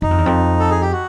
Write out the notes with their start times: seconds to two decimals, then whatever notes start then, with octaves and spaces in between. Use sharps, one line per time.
0.02 F#2 D#4
0.11 F2
0.18 E2
0.26 F2
0.59 A4
0.71 G#4
0.81 G4
0.92 F#4